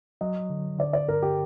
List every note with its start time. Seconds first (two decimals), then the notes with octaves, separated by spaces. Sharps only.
0.21 F#3 D#5
0.50 D3
0.79 D3 D5
0.93 D5
1.08 G2 A#4
1.22 G4